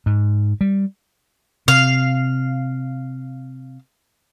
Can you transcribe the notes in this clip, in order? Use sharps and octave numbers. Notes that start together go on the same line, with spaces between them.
G#2
G3
C3 F5